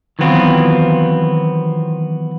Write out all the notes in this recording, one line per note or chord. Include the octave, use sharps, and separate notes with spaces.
D#3 E3 F#3 B3 C4 F4